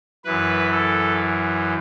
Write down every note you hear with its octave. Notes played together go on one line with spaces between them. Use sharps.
F#2 E3 B4
A4